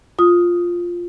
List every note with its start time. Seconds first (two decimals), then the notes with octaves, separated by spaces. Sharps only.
0.19 F4 D#6